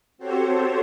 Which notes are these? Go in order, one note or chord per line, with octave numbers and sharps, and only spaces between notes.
C4 F#4 G4 A4 C5 C#5